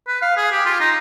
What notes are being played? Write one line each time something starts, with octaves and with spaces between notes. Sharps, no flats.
B4
F5
G#4
G4
F4
D#4